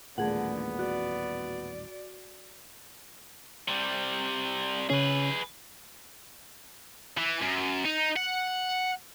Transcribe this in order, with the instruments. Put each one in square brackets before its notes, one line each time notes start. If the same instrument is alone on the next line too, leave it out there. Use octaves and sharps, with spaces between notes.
[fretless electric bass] D#1 A1 A#2 [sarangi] D3 [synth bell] A3 G#4 F#5 [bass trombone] B3
[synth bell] F#4 [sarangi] D5
[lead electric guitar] C3 G3
[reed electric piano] C#3 C#4 [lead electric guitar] G#4 B4
[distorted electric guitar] E3
F#2
D#4
F#5